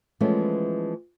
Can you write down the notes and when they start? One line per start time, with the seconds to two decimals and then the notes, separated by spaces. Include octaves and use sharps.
0.20 E3 F3 G#3 A3 B3 C#4